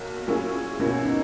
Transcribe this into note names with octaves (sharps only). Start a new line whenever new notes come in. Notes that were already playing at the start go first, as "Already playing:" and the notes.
Already playing: B1 A#3
A#2 F#3 C#4 E4 G#4
B2 A#3 C#4 E4
D#4